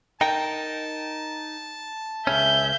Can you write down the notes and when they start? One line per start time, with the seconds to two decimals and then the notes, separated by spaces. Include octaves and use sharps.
0.21 D#4 A#4 G5 A5
2.27 C#2 C#3 C#4 E5 G6